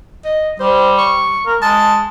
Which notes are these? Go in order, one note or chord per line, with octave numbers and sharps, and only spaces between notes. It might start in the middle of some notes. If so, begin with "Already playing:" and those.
D#5
G3 C5
C#6
A#4
G#3 A5